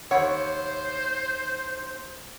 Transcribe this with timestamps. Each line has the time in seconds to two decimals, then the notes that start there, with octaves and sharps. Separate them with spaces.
0.11 D#2 E4 C5 C#5 F#5